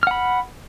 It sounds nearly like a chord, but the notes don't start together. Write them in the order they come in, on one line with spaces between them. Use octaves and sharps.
F6 F#5 B5